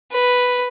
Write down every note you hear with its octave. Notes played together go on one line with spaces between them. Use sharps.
B4